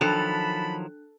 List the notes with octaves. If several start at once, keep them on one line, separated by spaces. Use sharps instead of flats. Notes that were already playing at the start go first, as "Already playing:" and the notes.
D#3 F3 F#3 D4 A4 A5 B5 F#6